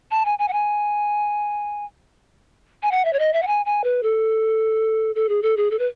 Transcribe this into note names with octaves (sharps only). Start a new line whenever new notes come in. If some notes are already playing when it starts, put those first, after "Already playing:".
A5
G#5
G#5
F#5
G#5
G#5
F#5
E5
C#5
D#5
E5
F#5
G#5
G#5
B4
A4
A4
G#4
A4
G#4
A4
B4